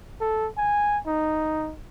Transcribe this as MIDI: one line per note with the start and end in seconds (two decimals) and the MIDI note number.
0.21 0.49 69
0.58 0.99 80
1.07 1.74 63